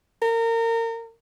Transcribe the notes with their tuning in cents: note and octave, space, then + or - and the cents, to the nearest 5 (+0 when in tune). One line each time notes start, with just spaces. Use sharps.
A#4 -30